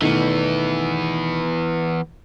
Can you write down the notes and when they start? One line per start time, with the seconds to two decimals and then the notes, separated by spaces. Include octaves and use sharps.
0.02 B2 D#3 E3 A3 B3